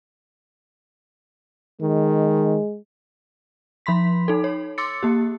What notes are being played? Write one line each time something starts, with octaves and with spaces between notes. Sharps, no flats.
D#3 G#3
F3 B5 C6 B6
D#4 A4
C#5
C6 D6 E6 A6 C#7
A#3 G4